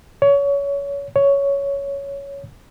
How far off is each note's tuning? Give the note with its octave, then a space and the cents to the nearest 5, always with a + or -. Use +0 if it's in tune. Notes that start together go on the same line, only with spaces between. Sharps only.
C#5 +25
C#5 +10